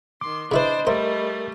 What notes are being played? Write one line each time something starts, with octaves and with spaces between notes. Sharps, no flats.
D#3 C6 D6
C#3 D4 E4 B4 C5 D#5 B5
G3 A3 A#4 C5 E5